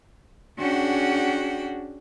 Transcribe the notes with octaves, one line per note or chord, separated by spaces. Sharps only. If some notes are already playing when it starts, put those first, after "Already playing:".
C#4 D4 F#4 G#4 F#5 G5